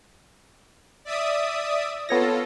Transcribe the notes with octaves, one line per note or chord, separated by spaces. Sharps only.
D5 E5 D#6
B3 F4 A4 C#5 A#6